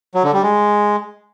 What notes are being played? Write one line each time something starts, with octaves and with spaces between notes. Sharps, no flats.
F#3
D3
G3
G#3